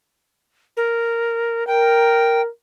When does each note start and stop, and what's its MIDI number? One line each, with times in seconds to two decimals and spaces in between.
0.77 1.66 70
1.67 2.48 70
1.67 2.41 79